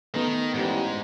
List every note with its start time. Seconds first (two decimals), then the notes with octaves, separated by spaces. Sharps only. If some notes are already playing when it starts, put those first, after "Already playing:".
0.15 D#3 A3 B3 D#4
0.54 A1 G#2 E3 G3